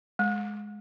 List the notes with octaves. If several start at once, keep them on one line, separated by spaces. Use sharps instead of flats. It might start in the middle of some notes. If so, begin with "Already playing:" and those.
G#3